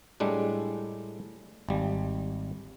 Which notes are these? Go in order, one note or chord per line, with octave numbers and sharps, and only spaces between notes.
A2 G3 G#3 D4
G#1 G3